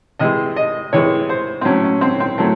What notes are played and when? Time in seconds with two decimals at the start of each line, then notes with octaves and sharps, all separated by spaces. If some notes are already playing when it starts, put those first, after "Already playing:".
0.19 C3 E3 G#3 D#5
0.56 D#5
0.93 C3 E3 G#3 C#5
1.29 C5
1.61 C4
1.65 A2 F#3 C#4
1.84 C#4
2.01 C4
2.20 C4
2.38 A2 F#3 A3